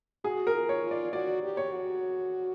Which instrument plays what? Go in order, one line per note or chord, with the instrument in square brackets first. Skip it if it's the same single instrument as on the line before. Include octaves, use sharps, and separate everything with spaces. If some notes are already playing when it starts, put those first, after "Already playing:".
[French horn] F#4 [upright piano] G#4
[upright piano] A#4
[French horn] F4
[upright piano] C#5
[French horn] F4
[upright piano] D5
[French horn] F#4 [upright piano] D5
[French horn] G4
[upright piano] C#5
[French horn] F#4